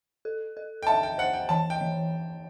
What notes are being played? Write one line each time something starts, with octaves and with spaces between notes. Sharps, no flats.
A4
A4
G5
E5 A5
G5
C5 F#5
G5
E3 A5
G5
E3